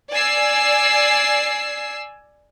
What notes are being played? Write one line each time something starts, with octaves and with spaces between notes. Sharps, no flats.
D5 G#5 E6 C7